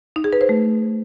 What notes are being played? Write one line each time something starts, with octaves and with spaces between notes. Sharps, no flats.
D#4
G#4
B4
C5
A3